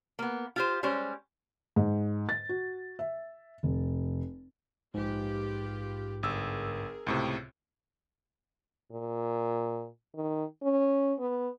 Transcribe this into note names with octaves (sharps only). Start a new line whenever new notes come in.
A#3 B3
F4 G4 C5
G3 G#3 C#4 C5
G#2
A6
F#4
E5
F1
A#1 G#2 F4 G4 B4
G1 G#4 A#4 E6
C#2 A2 C3
A#2
D#3
C#4
B3